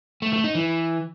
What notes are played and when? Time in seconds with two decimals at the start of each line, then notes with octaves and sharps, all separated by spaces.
0.22 A3
0.33 A3
0.44 D#4
0.55 E3